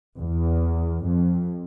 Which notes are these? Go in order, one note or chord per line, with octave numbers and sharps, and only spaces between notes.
E2
F2